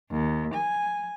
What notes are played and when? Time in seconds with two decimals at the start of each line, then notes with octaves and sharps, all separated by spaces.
0.11 D#2
0.53 G#5